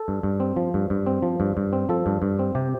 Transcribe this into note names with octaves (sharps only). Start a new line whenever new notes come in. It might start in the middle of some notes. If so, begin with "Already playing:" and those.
Already playing: A4
G2
G2
C4
F3
G2
G2
C4
F3
G2
G2
C4
F3 A4
G2
G2
C4
C3 G4